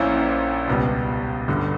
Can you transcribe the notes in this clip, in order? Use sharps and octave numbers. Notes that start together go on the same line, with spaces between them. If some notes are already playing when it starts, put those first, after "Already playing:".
Already playing: A#1 A#2 A#3 C#4 E4
C#2 B2 G3
G1 G2 D3